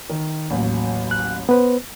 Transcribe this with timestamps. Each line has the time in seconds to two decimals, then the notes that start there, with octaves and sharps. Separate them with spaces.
0.10 D#3
0.50 A1 D#2 F#3
1.11 F#6
1.49 B3 B4 C5